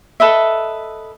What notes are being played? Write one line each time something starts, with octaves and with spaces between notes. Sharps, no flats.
A4 B4 D#5 E5